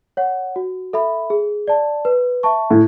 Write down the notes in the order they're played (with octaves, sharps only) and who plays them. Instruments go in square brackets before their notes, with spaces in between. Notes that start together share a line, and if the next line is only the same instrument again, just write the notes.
[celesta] C#5 F#5
F#4
A4 E5 B5
G#4
D5 A5
B4
E5 A5 C#6
[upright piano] A2